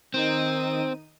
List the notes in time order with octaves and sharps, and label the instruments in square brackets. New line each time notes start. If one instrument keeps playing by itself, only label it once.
[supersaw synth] D#3 D#4 D#7 [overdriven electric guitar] C4